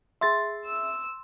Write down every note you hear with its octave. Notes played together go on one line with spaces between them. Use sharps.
G#4 E5 C6 A6
E6